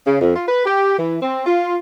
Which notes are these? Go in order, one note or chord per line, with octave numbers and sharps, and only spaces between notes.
C#3
F2
F4
B4
G4
E3
C4
F4